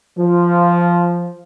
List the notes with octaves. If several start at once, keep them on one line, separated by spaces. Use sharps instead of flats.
F3